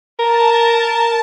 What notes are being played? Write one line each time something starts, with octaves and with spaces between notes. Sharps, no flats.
A#4 A5